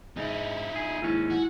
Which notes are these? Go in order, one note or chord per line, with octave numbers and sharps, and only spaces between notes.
G#2 D#4 E4
G#4
D#2 G#2 G#3 C#4 E4
F#4